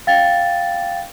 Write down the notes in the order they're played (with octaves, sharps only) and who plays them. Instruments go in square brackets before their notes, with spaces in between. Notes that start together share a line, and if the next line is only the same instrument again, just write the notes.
[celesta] F5 G5 A6